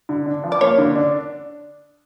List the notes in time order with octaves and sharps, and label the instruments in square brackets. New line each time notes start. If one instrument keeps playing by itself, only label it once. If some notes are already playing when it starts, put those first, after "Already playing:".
[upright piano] D3
D4
F3
[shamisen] D5
[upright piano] A#3 [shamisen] C#5
[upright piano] D3
D4